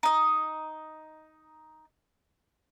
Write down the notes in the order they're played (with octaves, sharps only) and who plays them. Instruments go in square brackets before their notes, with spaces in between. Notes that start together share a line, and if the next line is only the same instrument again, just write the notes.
[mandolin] D#4 D#5